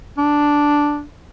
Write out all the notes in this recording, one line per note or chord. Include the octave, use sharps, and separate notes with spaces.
D4